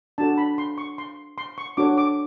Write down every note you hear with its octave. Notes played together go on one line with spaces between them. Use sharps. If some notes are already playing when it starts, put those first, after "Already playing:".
D4 F#4 A4 A5
B5
C6
C#6
C6
C6
C#6
D4 F#4 A4 C#5 D6
D6